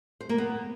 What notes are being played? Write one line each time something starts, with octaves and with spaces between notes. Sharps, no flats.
C5
A#3
B3